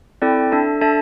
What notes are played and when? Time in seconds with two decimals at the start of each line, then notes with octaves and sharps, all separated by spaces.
0.22 C4 E4 A4 D5 G5
0.52 D4 A4 E5 A5
0.81 D4 A4 E5 A5